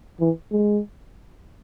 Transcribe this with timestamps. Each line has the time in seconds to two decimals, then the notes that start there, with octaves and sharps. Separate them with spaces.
0.20 E3
0.52 G#3